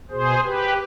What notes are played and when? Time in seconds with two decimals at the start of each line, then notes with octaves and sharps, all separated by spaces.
0.11 B2 G#4 C5
0.44 G4 B4